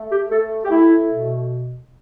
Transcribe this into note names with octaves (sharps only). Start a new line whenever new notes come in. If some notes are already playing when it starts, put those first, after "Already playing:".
Already playing: A3
G4
A3 A4
G4
A3 E4
B2